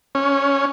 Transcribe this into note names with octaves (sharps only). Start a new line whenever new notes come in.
C#4